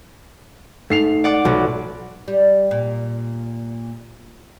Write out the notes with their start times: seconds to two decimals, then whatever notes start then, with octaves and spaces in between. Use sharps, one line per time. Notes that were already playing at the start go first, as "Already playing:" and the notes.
0.90 G#2 A3 C7 F7
1.24 D5 F#5 D6
1.45 B1 F3 F#3 A3
2.28 G3
2.71 A#2